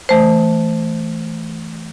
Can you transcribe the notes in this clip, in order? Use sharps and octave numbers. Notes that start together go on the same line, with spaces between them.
E3 A3 C5